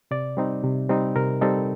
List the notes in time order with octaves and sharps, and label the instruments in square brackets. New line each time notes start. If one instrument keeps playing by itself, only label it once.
[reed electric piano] C3 D5
G3 C4 D#4
C3
G3 C4 D#4
C3 A#4
G3 C4 D#4 A4